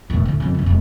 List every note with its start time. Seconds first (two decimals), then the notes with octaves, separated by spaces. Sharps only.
0.10 E1 A2
0.25 D2 A2
0.40 F2 C#3
0.54 C2 F#2
0.66 E1 C#3